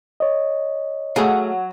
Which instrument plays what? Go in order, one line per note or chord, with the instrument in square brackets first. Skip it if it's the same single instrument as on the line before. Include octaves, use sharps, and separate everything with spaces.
[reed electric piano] C#5 D#5
[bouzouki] F#3 [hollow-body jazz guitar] A3 G#4 F5